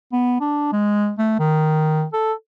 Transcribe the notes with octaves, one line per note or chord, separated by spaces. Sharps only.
B3
D4
G#3
A3
D#3
A4